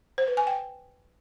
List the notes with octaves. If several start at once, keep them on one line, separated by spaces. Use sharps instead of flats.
C5
B4
G#5
G5